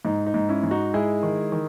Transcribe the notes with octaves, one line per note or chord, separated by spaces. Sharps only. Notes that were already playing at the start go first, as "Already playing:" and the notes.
G#2 D#4
D#4
G#2
C#4 E4
G#2
D#4 F#4
G#3 E4 G#4
D#3
D#3